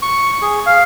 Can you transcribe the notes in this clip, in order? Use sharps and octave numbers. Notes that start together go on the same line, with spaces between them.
C#6
G#4
F5